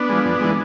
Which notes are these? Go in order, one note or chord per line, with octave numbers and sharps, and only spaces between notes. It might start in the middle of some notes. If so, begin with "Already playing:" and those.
Already playing: B3 D4
F3 G#3
F2
E3 G#3